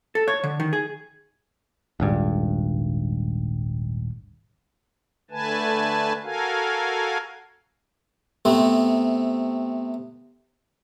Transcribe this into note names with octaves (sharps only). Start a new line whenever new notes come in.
A4
C#5
D3
D#3
G#4
D#1 G#1 G2
D3 A3 B4 G#5 A5
F#4 A4 A#4 F5 G#5
C3 A3 B3 C4